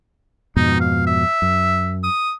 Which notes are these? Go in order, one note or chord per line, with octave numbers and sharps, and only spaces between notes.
F2 G#2 B2 D#4
F5
E5
F#2
D#6